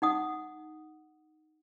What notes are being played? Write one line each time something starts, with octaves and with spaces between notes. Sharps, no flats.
D#4 F#5 D#6